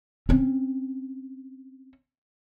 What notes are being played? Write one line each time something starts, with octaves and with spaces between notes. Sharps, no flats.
C4 C#4